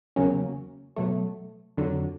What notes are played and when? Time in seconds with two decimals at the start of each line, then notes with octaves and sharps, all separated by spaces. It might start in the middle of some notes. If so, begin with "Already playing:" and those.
0.16 E2 C#3 F#3 A#3 C#4
0.96 B2 F#3 A3
1.77 F2 D3 F#3